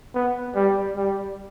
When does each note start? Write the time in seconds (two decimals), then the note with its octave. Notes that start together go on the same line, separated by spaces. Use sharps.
0.14 B3
0.55 G3
0.97 G3